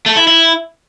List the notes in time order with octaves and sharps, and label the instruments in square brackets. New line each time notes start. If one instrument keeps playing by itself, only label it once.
[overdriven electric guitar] A3
E4
E4